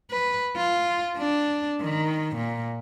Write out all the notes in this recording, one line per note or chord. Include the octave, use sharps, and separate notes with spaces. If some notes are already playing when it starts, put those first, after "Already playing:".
B4
F4
D4
D#3
A#2